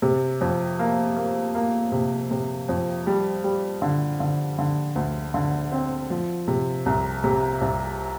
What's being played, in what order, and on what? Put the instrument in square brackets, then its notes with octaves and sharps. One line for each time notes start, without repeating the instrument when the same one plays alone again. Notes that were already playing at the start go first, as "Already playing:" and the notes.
[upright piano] C3
F2
A#3
A#3
A#3
C3
C3
F2
G3
G3
D3
D3
D3
D2
D3
C4
F3
C3
C2
C3
C2